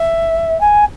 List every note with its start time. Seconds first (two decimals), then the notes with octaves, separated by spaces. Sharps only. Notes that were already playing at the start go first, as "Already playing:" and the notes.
Already playing: E5
0.60 G#5